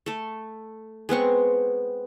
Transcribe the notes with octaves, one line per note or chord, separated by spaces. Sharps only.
A3 A4
G#3 B3 C4 C#6